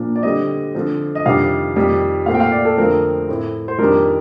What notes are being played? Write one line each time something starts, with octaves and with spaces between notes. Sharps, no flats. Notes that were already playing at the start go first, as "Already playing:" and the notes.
Already playing: A#2 F3 A#3 D4
D5
D3 G3 C4 D#5
D3 F3 C4
D#5
F2 C3 D#3 G3 D4 F5
F2 D#3 G3
A#2 A3 C4 F5
G5
F5
D5
A4
F2 D3 F3 A3 C4 A#4
A2 A3 C4
C5
F2 D#3 G3 D4 A#4